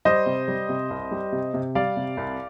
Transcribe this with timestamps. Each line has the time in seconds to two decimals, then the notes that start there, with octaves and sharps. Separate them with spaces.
0.05 G3 C5 D#5
0.26 C3
0.48 G3
0.69 C3
0.90 C2
1.11 G3
1.32 C3
1.54 C3
1.75 G3 D5 F5
1.97 C3
2.17 C2